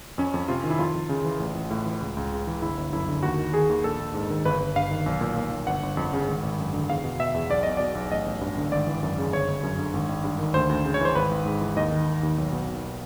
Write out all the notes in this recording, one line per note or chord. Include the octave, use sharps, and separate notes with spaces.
F2 C#4
F2
C3 F4
D#3
E4
F2 F4
F2
C#3
E3
A1
A1
A2
E3
C#2
C#2
C#3
E3
G1 E4
G1
F#2 E4
D3
D#2 F#4
D#3
D#3 G#4
D#2
A#1 A4
A#1
G#2
D#3
G1 B4
G1
G2 F5
D#3
B1
A#2
A#2
B1
G1 F#5
G1
F2
C#3
G#1
G#1
F#2
D3
E2 F5
B2
B2 E5
E2
B1 D5
B2 D#5
B2 D5
B1
A1 D#5
A1
G2
D3
G#1 D5
E3
F#2
C#3
G1 C#5
G1
F#2
D3
G#1
G#1
G2
D#3
D2 C5
D2
C#3
C#5
E3 C5
G#1 B4
G#1
G#2
E3
D#2 D#5
D#3
D#3
D#2
B1
B2
B2